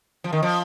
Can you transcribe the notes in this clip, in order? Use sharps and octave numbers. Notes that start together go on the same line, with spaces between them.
F3
D#3
F3